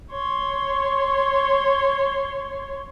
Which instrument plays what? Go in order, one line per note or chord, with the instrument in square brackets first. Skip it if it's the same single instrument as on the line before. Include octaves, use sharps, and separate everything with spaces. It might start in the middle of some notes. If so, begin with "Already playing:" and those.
[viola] C#5 C6